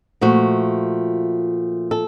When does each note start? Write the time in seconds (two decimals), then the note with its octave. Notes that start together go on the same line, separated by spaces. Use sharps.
0.21 A#2 F3 A3 F#4
1.91 A4